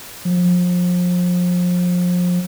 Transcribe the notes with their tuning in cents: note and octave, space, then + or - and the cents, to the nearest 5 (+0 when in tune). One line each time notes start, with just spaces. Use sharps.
F3 +30